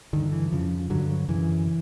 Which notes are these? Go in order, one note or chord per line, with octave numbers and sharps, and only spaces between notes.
G2 D3 D#3
E3
F2 C#3 F3
G2 D3 F#3
F#3
F#2 C#3 E3